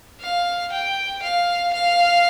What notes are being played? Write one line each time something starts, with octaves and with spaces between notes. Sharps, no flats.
F5
G5
F5
F5